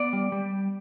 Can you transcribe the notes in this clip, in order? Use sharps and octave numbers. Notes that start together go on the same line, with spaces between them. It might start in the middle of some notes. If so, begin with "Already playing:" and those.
Already playing: B3 D5
G3
G3